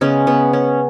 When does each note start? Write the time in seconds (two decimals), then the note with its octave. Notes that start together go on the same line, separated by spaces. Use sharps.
0.01 C#3 G#3 B3 C#4
0.27 B3
0.53 C#4